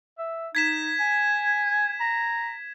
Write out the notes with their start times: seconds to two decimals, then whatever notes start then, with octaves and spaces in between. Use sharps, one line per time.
0.19 E5
0.55 D#4 G#6 B6 E7
1.00 G#5
2.00 A#5